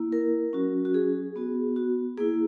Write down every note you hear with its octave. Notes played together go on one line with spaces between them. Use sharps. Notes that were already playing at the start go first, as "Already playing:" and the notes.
Already playing: A#3 E4
A#4
F#3 C#4 F#4
F#4
G#4
B3 F#4
F#4
A#3 E4 G#4